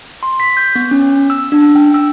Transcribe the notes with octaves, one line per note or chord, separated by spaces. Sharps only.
C6
B6
G6
B3
C#4
E6
D4
G5
E6